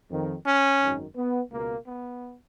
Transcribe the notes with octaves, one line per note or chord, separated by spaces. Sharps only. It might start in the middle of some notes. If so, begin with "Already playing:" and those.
F2 D#3
C#4
G#1 F#2 D#3
B3
C#2 B2 A#3
B3